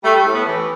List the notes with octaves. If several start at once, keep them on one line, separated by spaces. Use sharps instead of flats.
G3 A3
A2
B3
E3